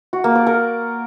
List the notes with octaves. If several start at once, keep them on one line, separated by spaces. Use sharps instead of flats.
F#4
A#3
D5
A#4